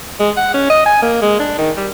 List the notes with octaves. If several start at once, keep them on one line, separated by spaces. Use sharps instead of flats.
G#3
F#5
C#4
D#5
G#5
A#3
G#3
D4
D#3
G3